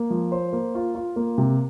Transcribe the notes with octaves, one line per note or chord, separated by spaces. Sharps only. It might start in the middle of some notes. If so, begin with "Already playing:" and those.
Already playing: A#3
F3
C5
A#3
F4
F4
A#3
C3